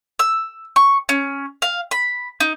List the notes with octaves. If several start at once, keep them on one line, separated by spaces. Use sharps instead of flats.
E6
C#6
C#4
F5
B5
D#4